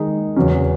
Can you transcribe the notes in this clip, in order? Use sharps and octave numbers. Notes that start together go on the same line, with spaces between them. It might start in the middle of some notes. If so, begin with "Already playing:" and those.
Already playing: D#3 G#3 D#4
E2 C#3 F#3 C#4